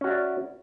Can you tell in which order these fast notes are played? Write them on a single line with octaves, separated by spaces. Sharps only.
C#4 F#4 E5 D5